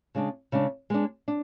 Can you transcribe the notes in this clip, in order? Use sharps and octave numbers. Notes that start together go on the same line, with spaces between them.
C#3 G#3 D4
C#3 G#3 D4
G#3 B3 D4
D4